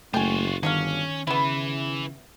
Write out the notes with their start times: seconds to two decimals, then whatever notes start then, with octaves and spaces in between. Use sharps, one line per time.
0.14 F#1 A3 F4 F#4 G5 G#5
0.63 G1 D#3 F#3 C#4 D4 F5
1.27 C#3 E3 B3 E4